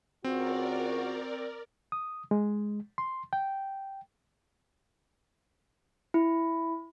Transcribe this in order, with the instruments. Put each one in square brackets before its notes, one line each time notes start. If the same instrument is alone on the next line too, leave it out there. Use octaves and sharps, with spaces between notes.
[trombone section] C#2 F#4 [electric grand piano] C4 [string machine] A#4 D5
[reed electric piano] D#6
G#3
C6
G5
[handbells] E4